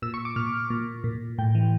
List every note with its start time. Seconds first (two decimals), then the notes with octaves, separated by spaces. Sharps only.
0.02 A#2 E6
0.14 C#6
0.25 D6
0.36 A#2 F6
0.70 A#2
1.04 A#2
1.38 A2 G5
1.55 E3